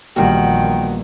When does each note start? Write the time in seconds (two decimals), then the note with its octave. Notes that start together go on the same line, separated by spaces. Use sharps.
0.16 A#1 E2 A#2 D#3 G3 F#4 F#5 G5